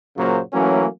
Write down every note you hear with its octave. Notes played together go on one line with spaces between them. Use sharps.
F#2 A#2 C#3 F#3 A#3 C5
E3 F#3 A3 A#3 C#4